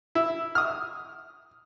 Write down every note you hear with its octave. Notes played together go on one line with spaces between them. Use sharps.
E4
D#6 F6